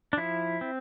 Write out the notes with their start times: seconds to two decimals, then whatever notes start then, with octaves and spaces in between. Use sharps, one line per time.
0.13 D4
0.17 F3 E4
0.61 C4